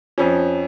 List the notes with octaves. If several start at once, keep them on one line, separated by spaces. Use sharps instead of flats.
F2 F3 C#4